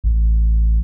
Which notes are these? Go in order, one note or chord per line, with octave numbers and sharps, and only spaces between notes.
A1